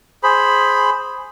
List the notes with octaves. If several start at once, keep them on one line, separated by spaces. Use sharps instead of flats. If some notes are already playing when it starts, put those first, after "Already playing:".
G#4 C5 B5